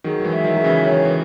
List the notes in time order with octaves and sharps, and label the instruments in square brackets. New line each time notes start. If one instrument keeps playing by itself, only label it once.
[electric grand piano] D#3 F#3 [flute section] G#4
[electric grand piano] F#3
E3 G#3
[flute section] E5
[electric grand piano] D#3 F#3
[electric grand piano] F#3 [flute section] G#4
[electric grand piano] C#3 E3
[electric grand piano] D#3 [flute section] C#5
[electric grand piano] E3